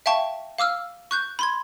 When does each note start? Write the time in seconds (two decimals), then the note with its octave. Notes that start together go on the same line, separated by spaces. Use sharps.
0.06 E5 F5 G5 A5 C#6
0.58 F5 D6 E6 F6
1.11 C#6 F#6 G6
1.39 B5 C6 G#6